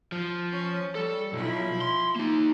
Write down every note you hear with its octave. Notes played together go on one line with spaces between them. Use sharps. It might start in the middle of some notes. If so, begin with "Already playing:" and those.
F3
C#4
G3 A4
B1 F3 E4
C6
A#3 D#4